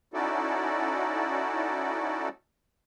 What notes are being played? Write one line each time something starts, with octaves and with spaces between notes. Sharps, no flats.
C#4 D#4 E4 F#4 A4 D5